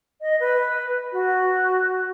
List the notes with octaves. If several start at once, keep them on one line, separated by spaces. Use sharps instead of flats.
D#5
B4
F#4